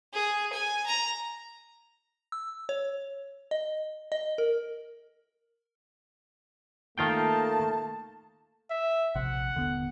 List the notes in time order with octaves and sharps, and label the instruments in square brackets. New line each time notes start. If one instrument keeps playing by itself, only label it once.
[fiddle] G#4
G#5
A#5
[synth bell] E6
C#5
D#5
D#5
A#4
[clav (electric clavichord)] D#3 F4 G5 [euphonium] A3 [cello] A#3 [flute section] A5
[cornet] E5
[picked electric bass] A#1 C3 [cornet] F#5
[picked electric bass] D#1 D3 B3